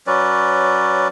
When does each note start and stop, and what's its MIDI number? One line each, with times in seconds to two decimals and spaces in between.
0.07 1.08 54
0.07 1.08 61
0.07 1.08 71
0.07 1.08 74